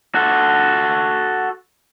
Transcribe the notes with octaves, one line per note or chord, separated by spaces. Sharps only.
F#4 A4